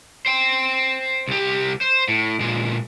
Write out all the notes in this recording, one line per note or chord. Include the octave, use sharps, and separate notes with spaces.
C5 G5
C2 G4
C5
A2
A#2 G#3